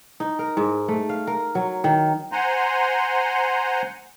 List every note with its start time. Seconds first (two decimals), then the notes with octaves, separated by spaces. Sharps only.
0.20 D#4
0.39 A#4
0.57 G#2
0.88 A3
1.09 F5
1.27 A#4
1.55 F#3
1.84 D#3
2.32 C5 F#5 G#5 A#5 C6